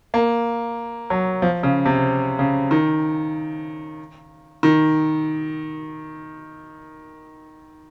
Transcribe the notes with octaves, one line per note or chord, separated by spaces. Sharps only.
A#3
F#3
F3
C#3
C3
C#3
D#3
D#3